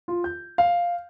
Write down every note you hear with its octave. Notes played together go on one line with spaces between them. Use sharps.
F4
G6
F5